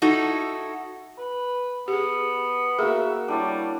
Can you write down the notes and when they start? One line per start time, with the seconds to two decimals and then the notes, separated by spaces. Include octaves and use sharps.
0.02 D#4 E4 F#4 A4
1.18 B4
1.88 B3 G4 G#4
2.79 A#3 F#4 G#4 E5
3.28 G3 D4 E4 C#5